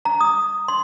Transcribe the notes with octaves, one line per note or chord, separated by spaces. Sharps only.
A#5
D#6
C6